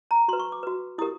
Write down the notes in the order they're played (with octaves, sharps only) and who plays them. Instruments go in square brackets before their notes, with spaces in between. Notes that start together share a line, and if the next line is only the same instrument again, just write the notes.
[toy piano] A#5
F#4 C6
B4
C#6
D6
F#4 B4
E4 G4 A#4 D#6